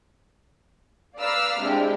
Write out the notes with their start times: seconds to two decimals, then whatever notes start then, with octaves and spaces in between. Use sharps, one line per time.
1.18 B4 D5 F5 A#5 E6 F6
1.61 C3 G#3 D4 E4 G4